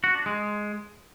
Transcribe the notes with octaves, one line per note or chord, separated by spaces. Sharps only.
F#4
D4
G#3